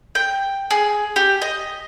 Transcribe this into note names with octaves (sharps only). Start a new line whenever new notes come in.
G5
G#4
G4
D#5